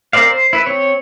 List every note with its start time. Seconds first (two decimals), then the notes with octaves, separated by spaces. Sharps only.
0.13 C4 A#4 C5 D5 F5
0.31 C5
0.53 E4 B4
0.66 C4 C#5